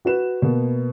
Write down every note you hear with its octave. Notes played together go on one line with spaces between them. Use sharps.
F#4 B4 E7
B2 A#3 B3